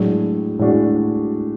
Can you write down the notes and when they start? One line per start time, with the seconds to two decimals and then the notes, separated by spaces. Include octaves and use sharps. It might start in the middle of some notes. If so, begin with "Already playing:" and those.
Already playing: A2 F#3 G#3 D4 F#4
0.59 A2 G#3 D4 F#4